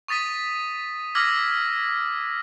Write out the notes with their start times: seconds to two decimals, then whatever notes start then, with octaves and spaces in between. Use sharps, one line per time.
0.08 C#6 D#6 A6 B6 D#7
1.15 D6 E6 F6 G#6 A#6 B6